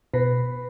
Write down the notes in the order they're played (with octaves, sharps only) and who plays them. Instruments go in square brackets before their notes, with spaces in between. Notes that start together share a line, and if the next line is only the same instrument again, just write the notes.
[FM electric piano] B2 [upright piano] B4